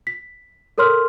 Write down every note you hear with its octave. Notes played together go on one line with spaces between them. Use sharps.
B6
A4 A#4 C#5 C6 F6